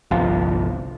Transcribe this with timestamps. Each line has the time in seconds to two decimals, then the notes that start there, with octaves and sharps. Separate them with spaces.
0.11 G1 C2 F3